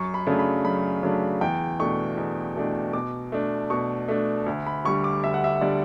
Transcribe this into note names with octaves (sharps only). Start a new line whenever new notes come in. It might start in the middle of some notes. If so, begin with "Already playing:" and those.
Already playing: F#2 C#6
B5
C#3 F#3 A3 D4
B5
F#2 B5
C#3 F#3 A3 D4
E2 G5
B2 A3 D4 C#6
E2
B2 A3 D4
B2 D6
A3 D4
B2 C#6
A3 D4
D2
B5
D3 G3 C#6
D6
D2 E5
F#5
E5
D3 G3 D5